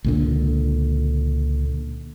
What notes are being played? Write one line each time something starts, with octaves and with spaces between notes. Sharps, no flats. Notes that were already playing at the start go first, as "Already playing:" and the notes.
C#2 A#2 D3